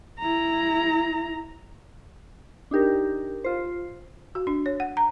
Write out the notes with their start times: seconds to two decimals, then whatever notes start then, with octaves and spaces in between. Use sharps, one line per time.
0.19 E4 A#5
2.71 D4 D#4 G4 A#4
3.44 F4 C5
4.35 F#4
4.47 D4
4.66 C#5
4.80 F#5
4.97 A#5